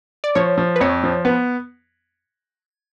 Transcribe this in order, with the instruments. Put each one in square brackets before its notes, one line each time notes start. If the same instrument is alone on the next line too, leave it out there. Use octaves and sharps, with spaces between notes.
[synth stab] D5
[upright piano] F3 [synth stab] C#5
[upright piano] F3
[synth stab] B4
[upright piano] F2 [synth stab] C#5
[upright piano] F3
[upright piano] B3 [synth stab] B4